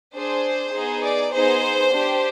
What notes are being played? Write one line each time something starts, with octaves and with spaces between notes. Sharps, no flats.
D4 G#4 C5
B3 D#4 G#4
D5
B3 D#4 G#4 C5
D4 G4